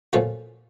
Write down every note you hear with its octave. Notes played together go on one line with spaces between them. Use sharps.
A#2 F3 A3 C#4 F#4